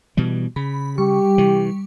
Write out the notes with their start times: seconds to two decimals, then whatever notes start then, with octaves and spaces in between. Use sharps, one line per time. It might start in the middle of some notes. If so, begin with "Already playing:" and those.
0.17 B2 E3 G3
0.56 C#3 B5
0.98 G3 G4 C#6
1.38 C3 E3